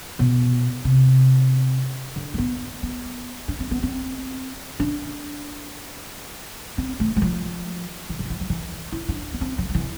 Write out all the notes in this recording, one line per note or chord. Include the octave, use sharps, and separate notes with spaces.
B2
C3
D3
A3
B3
B3
D4
C4
B3
C4
D4
C4
A3
G#3
F3
E3
F3
E3
F3
E3
E4
D4
B3
C4
F3
F3
E3